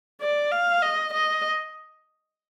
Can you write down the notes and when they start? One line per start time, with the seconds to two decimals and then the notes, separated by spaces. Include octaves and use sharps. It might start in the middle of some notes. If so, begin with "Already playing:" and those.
0.21 D5
0.51 F5
0.82 D#5
1.14 D#5